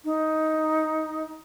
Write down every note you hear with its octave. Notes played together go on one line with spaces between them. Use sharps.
D#4